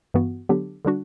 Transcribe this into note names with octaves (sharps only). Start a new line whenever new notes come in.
G2 E3 B3 F#4
D3 F#3 B3 D4 G4
D3 G3 D4 F#4